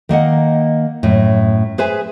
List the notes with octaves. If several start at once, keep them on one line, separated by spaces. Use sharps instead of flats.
D#3 A#3 D#5 F#5
F#2 A2
G#4 B4 C5 E5 G#5